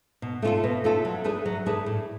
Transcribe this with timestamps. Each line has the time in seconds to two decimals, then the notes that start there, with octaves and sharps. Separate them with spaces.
0.22 B2
0.42 A3 C#4 F4 A4
0.64 B2
0.84 A3 C#4 F4 A4
1.05 F#3
1.24 A3 D4 G#4 B4
1.46 F#3
1.66 A3 D4 G#4 B4
1.86 A2